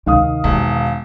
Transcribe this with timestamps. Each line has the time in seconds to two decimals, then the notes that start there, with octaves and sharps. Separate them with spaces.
0.06 D2 C3 D#3 F5 D#6
0.44 E1 A#3